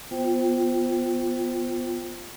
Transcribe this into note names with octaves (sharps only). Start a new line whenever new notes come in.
B3 F4 C5 G5